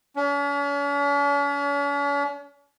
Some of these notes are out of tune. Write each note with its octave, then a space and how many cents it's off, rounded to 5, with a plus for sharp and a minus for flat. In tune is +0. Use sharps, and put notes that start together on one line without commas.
C#4 +45 C#5 +35